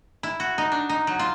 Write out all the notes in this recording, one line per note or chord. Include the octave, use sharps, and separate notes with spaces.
E4
F#4
D#4
D4
D#4
F#3
F4